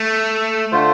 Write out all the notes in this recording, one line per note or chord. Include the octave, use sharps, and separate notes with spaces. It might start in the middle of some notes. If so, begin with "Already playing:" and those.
Already playing: A3
D3 A3 F4 C5